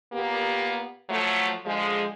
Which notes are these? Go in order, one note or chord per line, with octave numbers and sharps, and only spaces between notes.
A#2 A#3 B3 G4
F3 F#3 A3
D3 F3 G#3